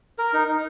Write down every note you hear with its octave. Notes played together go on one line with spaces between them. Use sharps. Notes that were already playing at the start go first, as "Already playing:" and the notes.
A#4
D#4
D#4